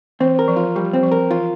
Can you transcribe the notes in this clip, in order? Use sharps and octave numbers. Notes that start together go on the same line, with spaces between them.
E3 C4
A#4
F3
F4
F3 G3
C4
F3
A#4
E3 F4